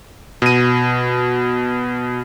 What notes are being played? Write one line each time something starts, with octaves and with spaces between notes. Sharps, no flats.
B2 D#7